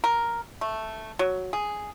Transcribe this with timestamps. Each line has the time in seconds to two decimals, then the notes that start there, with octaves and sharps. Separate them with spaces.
0.04 A#4
0.61 A3
1.19 F#3
1.53 G#4